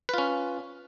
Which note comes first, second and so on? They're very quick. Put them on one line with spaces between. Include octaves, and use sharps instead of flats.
B4 F4 C#4